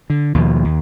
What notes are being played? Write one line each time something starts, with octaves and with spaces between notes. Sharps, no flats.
D3
D#2 B2 F3
D#2